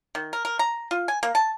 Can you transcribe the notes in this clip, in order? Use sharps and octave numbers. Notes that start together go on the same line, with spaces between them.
D#3
A#4
A#4
A#5
F4
G#5
A#3
A5